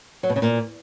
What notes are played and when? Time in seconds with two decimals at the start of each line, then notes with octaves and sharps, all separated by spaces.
0.23 F#3
0.30 B2
0.36 C#3
0.42 A#2